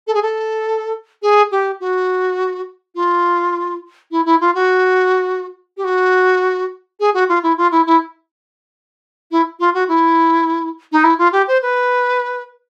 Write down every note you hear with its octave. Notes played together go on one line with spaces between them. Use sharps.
A4
G#4
A4
G#4
G4
F#4
F4
E4
E4
F4
F#4
G4
F#4
G#4
F#4
F4
E4
F4
E4
E4
E4
F4
F#4
E4
D#4
E4
F4
G4
C5
B4